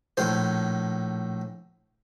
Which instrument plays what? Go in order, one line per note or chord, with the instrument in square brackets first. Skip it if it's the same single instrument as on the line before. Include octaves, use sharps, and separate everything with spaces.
[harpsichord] A#1 A2 C5